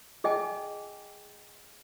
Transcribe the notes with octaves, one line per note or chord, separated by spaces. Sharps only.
G#4 D#5 G5 G#5